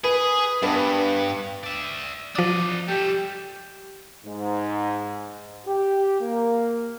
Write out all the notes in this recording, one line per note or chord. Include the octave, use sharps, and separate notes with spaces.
G#4 B4
G2 B3 D4 B4
D5 E5
F3 D4 D5 D#5 D#6
G3 G4 A4 G5
G#2
G4
A#3